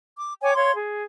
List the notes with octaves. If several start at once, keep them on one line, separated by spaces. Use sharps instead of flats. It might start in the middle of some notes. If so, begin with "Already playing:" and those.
D6
C#5 G5 G#5 D6
C#5 F5 C6 G#6
G#4